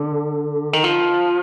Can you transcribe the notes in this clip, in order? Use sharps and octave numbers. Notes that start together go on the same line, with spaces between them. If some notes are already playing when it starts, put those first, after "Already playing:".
Already playing: D3
D#3
F3